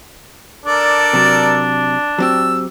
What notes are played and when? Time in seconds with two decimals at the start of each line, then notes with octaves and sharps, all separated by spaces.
0.65 D4 A4 A#4 D5
1.13 C3 F#3
2.18 F#3 C4 G4 E6